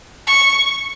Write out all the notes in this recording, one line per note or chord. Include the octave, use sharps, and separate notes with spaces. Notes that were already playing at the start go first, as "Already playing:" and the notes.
C#6